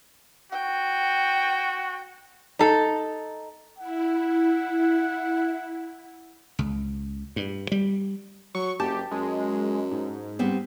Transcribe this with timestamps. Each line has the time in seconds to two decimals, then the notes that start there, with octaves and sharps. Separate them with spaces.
0.52 F#4 G5
2.59 D#4 A4
3.79 E4 F#5
6.59 C#2
7.36 G2
7.72 G3
8.55 F#3 C#6
8.80 F#1 G4 A5
9.11 F#2 G#3
9.91 G#2
10.39 G3 B3 C4